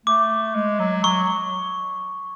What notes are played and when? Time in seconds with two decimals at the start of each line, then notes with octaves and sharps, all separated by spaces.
0.06 A3 D6
0.55 G#3
0.79 F#3
1.04 F#3 C#6